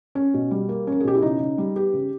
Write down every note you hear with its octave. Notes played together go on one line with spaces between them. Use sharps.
C#4
B2
G3
A#3
C#4 A#4
G#4
B2 G4
E4
C#3 D#4
C#3
G3
B3 G4
C#3